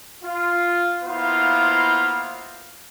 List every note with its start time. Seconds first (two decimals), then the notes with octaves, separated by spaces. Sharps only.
0.23 F4
1.04 A#3 B3 E4 F4 C5 F5